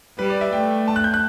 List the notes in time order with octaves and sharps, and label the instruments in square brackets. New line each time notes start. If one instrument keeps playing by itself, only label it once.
[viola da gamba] G3 [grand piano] B4
[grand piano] D5
E5
[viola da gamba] A3 [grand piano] G5
[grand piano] A5
F#6
G6
F#6